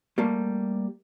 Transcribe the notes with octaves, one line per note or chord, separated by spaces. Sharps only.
G3 A3 A#3